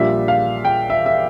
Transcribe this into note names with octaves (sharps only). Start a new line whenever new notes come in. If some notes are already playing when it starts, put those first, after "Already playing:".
Already playing: A#1 A#2 G3 D4 E5
F5
G5
E5
E5